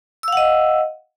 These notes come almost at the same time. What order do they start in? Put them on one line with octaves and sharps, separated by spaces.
E6 F5 F#5 D#5